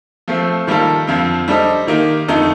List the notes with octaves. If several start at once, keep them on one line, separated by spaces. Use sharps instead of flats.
F3 A3 C4
D#3 G3 A#3 F4 A4
F2 D3 F3 C4
G3 D4 A4 C5 D#5
D#3 A#3 D#4 G4
F2 D3 A3 D#4 A4